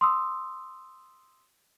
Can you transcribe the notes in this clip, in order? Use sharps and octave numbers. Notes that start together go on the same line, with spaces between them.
C6 D#6 E6